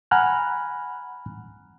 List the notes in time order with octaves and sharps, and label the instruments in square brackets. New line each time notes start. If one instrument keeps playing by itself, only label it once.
[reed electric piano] F#5 G#5 A#5 B5 F6 F#6